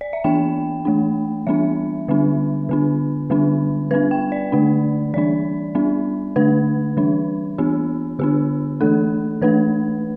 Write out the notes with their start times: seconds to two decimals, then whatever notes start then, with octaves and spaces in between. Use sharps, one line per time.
0.01 D5
0.13 E5
0.24 E3 B3 D4 G5
0.85 E3 A3 D4
1.47 E3 G3 B3 D4 E5
2.08 D3 G3 B3 D4
2.69 D3 B3 D4
3.30 D3 G3 B3 D4
3.91 G3 B3 D4 B4
4.11 G5
4.32 D5
4.52 D3 A3 D4
5.14 E3 G3 D4 D5
5.75 G3 B3 D4
6.36 D3 A3 D4 B4
6.97 E3 G3 D4
7.58 E3 B3 D4 G4
8.19 D3 B3 D4 G4
8.81 E3 A3 D4 A4
9.42 E3 A3 D4 B4